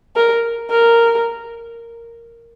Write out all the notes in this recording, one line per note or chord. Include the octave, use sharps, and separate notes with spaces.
A#4
A#4